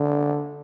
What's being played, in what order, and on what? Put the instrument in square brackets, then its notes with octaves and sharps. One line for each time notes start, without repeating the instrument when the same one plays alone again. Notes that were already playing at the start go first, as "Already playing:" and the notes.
Already playing: [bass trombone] D3